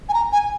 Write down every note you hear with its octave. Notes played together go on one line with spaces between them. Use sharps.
G#5
A#5
G#5